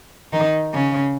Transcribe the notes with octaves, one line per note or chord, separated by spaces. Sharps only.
D#3 D#4
C#3 C#4